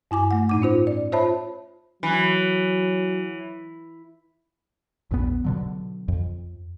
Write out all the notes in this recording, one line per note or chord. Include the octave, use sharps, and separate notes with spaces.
G2 E4 G#5 D6
A3 F#5
A2 D#4 D6
C#4 F4 C5
D5
F4 C5 C#5 E5 A5 B5
E3 F#3
A#1 E2 B3
B2 D3 F#3
F2